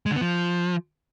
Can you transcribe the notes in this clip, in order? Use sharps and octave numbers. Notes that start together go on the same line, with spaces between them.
G#3
D3
B3
F3